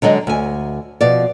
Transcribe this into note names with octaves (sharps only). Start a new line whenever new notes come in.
D3 F#3 G#3 D#5
D2 G#5
B2 F3 D5